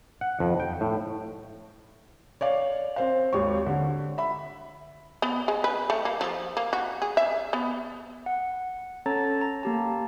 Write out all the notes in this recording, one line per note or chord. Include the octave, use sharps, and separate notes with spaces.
F#5
F2
G5
A2
C#5 D5 F5
C4 C5 F5
G#1 D#2 C#5 C#6
D3
E5 B5
B3
G#3
B4
A3
A#3
F3
A#3
F#4
G#4
E5
B3
F#5
C#4 A4 C#5 A5 A#5 A6
A#5
A#3 G4 A5